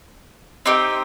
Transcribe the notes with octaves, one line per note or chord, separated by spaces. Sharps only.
C4 D#4 G4